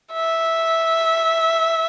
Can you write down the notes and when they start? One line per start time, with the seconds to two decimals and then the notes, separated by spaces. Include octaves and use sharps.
0.13 E5